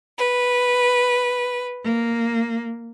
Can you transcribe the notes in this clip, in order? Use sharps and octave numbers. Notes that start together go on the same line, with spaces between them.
B4
A#3